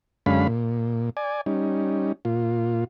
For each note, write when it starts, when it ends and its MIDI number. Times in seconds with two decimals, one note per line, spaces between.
0.26 0.47 42
0.26 0.47 50
0.26 0.47 56
0.26 0.47 61
0.26 0.47 77
0.26 0.47 83
0.47 1.10 46
1.17 1.41 74
1.17 1.41 80
1.46 2.12 55
1.46 2.12 61
1.46 2.12 63
2.25 2.84 46
2.25 2.84 65